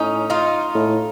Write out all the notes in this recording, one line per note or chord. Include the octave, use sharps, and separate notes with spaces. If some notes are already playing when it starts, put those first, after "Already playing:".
Already playing: A2 C#4 D#4
D#4 F4
A2